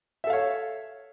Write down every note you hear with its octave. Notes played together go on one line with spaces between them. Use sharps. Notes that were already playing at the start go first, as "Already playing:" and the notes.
A4 C#5 E5 F5